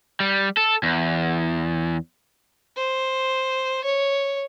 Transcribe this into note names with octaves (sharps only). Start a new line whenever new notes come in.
G3
A4
E2
C5
C#5